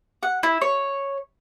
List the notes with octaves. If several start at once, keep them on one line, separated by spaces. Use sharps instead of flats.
F#5
E4
C#5